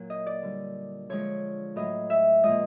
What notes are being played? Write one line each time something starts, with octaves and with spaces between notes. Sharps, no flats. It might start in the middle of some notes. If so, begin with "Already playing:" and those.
Already playing: A#2 F#3
D#5
D5
D3 G3
D3 F3 G#3 C#5
A2 F#3 D#5
E5
A#2 F3 G#3 D#5